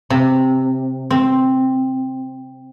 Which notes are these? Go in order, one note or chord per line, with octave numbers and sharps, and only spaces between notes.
C3
C4